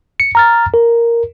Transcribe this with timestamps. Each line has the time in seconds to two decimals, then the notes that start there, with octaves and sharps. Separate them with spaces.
0.20 C#7
0.35 A#5 F6 A6
0.74 A#4